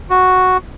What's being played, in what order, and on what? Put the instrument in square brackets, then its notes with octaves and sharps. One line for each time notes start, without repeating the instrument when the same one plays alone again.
[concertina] F#4